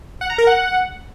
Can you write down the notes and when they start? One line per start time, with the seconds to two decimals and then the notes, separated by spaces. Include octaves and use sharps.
0.21 F#5
0.30 A#5
0.38 A#4
0.47 F#5